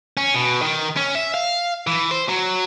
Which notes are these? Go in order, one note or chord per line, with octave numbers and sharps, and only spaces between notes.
C#4
B2
D#3
C#4
E5
F5
E3
C5
F#3